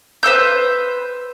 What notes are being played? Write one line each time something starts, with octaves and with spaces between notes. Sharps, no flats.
B4 C5 E6 G6